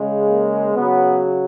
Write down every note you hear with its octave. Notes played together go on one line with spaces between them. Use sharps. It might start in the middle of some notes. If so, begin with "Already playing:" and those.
Already playing: C#3 G#3
A#3
C#3 F#3 B3